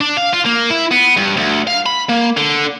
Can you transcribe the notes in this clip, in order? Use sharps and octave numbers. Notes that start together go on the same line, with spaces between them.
D4
F5
F4
A#3
E4
B3
G2
D2
F5
B5
A#3
D3